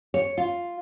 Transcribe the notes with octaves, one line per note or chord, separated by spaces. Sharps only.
C#5
F4